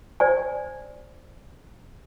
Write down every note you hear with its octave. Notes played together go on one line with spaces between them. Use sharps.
C5 D5 G#5